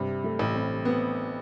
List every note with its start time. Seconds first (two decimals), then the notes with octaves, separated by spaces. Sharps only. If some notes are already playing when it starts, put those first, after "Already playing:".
Already playing: G2 C3
0.24 A3
0.39 A1
0.55 C4
0.85 B3 C4